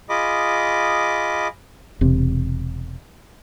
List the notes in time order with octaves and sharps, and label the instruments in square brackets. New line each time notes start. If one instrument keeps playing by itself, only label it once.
[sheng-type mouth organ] F4 G#4 D#5 B5 D6
[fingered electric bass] E1 C3